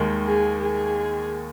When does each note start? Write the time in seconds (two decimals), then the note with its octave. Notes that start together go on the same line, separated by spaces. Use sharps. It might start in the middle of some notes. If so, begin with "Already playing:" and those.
Already playing: D#2 D#3 G#3
0.26 G#4
0.60 G#4